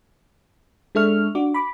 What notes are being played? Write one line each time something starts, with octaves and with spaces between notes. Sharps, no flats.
G#3 D4 A4 E5 C#6 F6
D4 F#4 D6
B5 D6